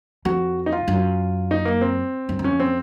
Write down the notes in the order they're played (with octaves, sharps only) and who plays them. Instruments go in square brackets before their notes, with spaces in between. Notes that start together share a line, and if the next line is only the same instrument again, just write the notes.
[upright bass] F2 [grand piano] F#4
[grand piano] D#4
F4
[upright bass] F#2
[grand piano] D#4
A#3
C4
[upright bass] F#2
F#2
[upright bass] F2 [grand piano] C#4
[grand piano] C4